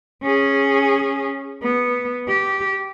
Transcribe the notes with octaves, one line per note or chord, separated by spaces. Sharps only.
C#4 G#4
B3
G4